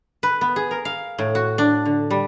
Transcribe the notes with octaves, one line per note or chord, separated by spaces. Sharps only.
B4
B3
G#4
A#4
F5
A2
F#4
D4
D3
G3